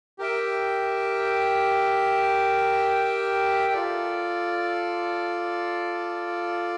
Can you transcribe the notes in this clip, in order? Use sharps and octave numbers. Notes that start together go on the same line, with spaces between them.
G4 A#4 E5 G5
F4 A4 D5